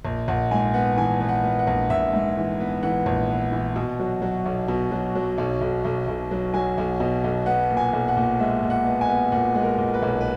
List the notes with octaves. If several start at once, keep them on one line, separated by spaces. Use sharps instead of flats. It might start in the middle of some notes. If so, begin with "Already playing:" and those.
A#1
A#1 F#5
G#2 G#5
B3 F#5
E3 G#5
B3
F#5
B3
F#5
A#1
A#1 E5
G#2
E3
B3
E3 F#5
A#1
B3
E3
B2
F#3
F#3
B1
B2
F#3
F#3
B1
B1
B1
B1
F#3
F#3 G#5
B1
B2
B1
B3 F#5
A#2
G#5
B1
F#5
A#2
G#3 E5
A#2
F#5
B3
G#5
B3
A#2 F#5
G#3
A#4
A#2
B4
B1
B4